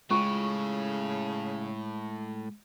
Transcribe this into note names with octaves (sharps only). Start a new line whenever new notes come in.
A2 C#3 G#3 C#4 F4 C#6